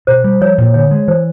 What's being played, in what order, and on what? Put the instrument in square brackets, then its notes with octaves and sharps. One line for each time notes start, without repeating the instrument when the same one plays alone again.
[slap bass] B2 [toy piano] C5
[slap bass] G3
[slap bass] F3 [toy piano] C#5
[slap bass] A#2
[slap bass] D3 [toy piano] C#5
[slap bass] G#3
[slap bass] E3 [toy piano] C5